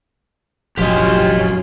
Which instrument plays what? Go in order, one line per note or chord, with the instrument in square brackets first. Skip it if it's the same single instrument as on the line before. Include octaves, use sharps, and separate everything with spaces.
[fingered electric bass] F1 A#1 [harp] F#2 [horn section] C#4 F4 [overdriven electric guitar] G4 D#5